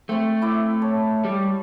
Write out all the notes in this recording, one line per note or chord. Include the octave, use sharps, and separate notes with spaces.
A3 C4 C#6
E4 D5
C#5 A5
G3